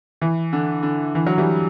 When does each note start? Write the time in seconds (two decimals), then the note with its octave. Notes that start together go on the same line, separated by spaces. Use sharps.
0.22 E3
0.53 D3
0.83 D3
1.15 E3
1.27 F#3
1.37 E3 G3